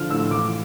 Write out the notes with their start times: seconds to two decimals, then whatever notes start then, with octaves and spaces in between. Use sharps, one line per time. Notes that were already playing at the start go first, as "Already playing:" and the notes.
Already playing: D3 F3 F6
0.10 A2 E6
0.31 E3 D6